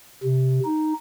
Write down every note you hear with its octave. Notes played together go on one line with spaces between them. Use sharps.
C3
D#4